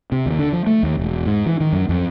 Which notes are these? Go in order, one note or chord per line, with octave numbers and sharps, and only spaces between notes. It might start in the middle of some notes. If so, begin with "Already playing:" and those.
C3
D#2
D3
F3
A3
D#2
E1
G#2
E3
D#3
F#2
F2